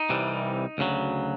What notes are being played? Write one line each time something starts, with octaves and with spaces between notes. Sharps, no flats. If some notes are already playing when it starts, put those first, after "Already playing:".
Already playing: D#4
C2 C3 E3 G3
D2 C#3 F#3